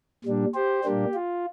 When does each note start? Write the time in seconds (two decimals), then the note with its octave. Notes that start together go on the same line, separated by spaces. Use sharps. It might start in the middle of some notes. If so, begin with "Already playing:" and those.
0.25 A#2 G3 D4
0.55 G4 C5
0.84 A#2 G3 A#3 D4 G4
1.14 F4